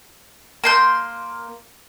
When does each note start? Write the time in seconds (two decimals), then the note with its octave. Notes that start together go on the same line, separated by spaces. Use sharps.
0.64 A#3 C6 G6